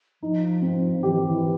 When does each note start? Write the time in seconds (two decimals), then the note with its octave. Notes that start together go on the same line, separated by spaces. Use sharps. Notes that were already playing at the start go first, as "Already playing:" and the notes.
0.22 F3 D#4
0.62 C4
1.03 E3 G4
1.13 D#3
1.24 E3